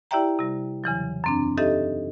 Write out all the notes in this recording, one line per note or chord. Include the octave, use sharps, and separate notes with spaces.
E4 G4 D5 E5 G5 A#5
C3 G3
E2 C#3 E3 F#3
F#2 C4 D4
D#4 G4 A4 D#5 E5